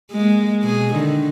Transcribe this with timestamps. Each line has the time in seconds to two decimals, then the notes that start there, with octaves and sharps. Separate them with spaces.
0.12 G#3 A#3
0.62 B2 G#4
0.93 D3 D#3